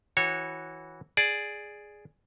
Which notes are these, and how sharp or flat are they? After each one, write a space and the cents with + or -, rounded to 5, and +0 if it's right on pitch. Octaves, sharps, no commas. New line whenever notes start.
E3 -15 F#4 +0 C#5 -20
G#4 +0 D5 +0